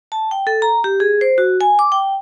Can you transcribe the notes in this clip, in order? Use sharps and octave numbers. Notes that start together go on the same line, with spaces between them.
A5
G5
A4
A#5
G4
G#4
C5
F#4
G#5
D6
G5